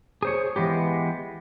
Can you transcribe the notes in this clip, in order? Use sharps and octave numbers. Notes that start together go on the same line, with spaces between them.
G#4 C5 C#5
E3 G#3 B3 G4